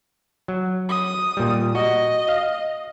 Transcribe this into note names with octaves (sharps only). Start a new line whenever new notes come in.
F#3
D#6
A#2 G3
F#4 D#5
F5